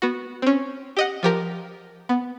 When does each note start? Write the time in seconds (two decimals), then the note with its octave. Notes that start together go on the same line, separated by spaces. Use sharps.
0.02 B3 F#4
0.42 C4 C#4
0.96 G4 D#5 F#5
1.23 F3 G4 A#4
2.09 B3